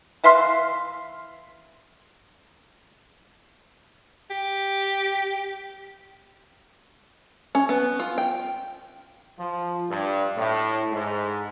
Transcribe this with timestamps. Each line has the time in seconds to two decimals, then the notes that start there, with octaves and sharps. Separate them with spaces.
0.24 E3 E5 F5 C6
4.30 G4
7.55 C#4
7.69 B3
7.99 F4
8.18 G5
9.37 F3
9.89 G2
10.37 A2
10.92 G#2